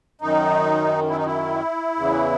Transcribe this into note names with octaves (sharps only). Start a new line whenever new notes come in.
F#2 D#3 D#4
E4
D#4
E4
E2 C#3 E3